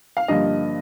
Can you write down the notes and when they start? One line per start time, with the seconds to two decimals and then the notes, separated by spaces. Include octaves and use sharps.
0.17 F5
0.28 G2 D3 F3 A#3 D#5